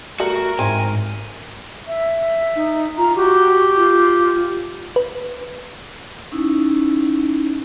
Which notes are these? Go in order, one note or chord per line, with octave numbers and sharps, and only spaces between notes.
G3 A3 F#4 A#4
G#2 C4 E4 G#5
E5
D#4
F4 A#5
F#4 G4
F4
B4
C#4 D#4 E4